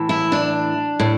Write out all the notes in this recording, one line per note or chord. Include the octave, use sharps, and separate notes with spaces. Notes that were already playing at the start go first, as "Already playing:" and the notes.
Already playing: A2 E3
E4
D4
A2